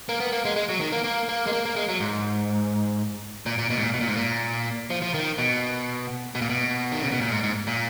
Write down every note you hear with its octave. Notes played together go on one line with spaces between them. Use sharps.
A#3
B3
A#3
G#3
G#3
F#3
D#3
A#3
A#3
A#3
G#3
A#3
A#3
G#3
F#3
G#2
A#2
A#2
B2
G#2
A#2
B2
A#2
G#2
A#2
F3
F3
D#3
B2
B2
A#2
B2
D#3
C#3
B2
A#2
G#2
G#2
A#2